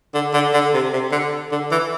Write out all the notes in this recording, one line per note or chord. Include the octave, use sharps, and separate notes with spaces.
D3
D3
D3
C3
C3
D3
D3
E3